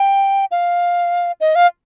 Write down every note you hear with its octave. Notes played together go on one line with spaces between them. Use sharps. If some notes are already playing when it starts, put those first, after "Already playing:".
Already playing: G5
F5
D#5
F5